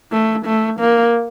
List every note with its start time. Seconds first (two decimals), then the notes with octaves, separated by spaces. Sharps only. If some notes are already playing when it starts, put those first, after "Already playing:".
0.12 A3
0.45 A3
0.80 A#3